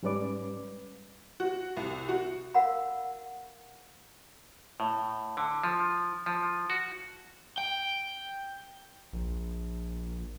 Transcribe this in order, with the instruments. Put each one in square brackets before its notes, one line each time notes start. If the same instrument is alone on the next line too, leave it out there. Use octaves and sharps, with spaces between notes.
[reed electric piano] G#2 G3 C#4 B4 D5 D6
[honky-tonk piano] F#4
C2
F#4
[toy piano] A#4 F5 F#5 B5
[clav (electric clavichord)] A2
D3
F3
F3
F#4
[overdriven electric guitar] G5
[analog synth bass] A#1